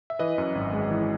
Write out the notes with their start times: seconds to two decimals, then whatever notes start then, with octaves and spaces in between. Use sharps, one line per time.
0.10 E5
0.19 E3 B4 D#5
0.38 F#2
0.55 G#1
0.73 G#3
0.91 E3